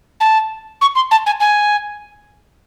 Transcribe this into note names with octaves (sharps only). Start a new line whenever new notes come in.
A5
C#6
C6
A5
G#5
G#5